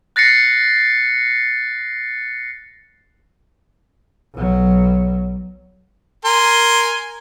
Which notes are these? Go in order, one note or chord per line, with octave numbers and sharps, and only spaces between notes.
F#6 A6 A#6 C7 C#7
B1 F#3
A#4 G#5 C6